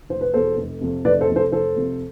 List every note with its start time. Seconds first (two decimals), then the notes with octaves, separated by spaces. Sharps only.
0.09 F1 C5
0.21 B4
0.34 E2 B2 A4 C5
0.57 F1
0.81 F2 C3
1.05 F1 B4 D5
1.21 A4 C5
1.28 F2 C3
1.36 A4 C5
1.52 F1 A4 C5
1.76 F2 C3